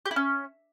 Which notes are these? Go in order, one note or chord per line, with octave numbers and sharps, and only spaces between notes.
G4
E4
C#4